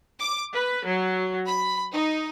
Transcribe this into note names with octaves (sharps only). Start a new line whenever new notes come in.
D6
B4
F#3
B5
D#4